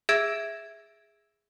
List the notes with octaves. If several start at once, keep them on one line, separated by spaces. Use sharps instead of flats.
G#4 E5 E6 G#6 A6 D7